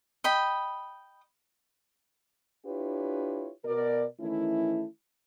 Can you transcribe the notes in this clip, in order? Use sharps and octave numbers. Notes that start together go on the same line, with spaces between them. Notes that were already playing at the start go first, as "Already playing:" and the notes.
D#5 G5 B5
D4 E4 F4 G4 B4 C#5
B2 A#4 D5
D#3 E3 A3 C#4 E4